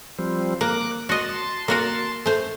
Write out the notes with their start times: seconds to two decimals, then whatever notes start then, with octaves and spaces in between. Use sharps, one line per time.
0.19 F3 G3 C4
0.61 A#3 D6 F#6
1.09 F#4 D#5 A5 C6
1.68 A#3 F#4 A#4
2.26 A3 C5